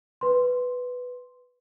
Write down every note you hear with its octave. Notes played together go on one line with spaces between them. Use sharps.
B4 C6